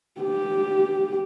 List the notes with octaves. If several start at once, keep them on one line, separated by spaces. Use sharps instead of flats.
G4